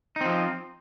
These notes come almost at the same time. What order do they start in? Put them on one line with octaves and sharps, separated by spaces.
D#4 C4 F3